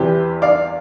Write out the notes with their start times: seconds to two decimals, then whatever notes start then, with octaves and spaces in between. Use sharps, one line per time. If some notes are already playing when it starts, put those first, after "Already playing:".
Already playing: E2 C3 E3 G4 B4
0.42 D5 F5